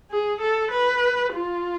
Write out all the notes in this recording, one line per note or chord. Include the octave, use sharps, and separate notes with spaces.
G#4
A4
B4
F4